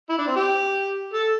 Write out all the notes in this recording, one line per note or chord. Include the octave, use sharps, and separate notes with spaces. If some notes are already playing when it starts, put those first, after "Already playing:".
E4
D4
C4
G4
A4